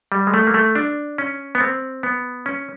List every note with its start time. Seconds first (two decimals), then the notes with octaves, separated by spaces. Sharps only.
0.12 G3
0.27 G#3
0.34 A3
0.47 A#3
0.54 A3
0.75 D4
1.18 C#4
1.55 B3
1.61 C4
2.03 B3
2.46 C#4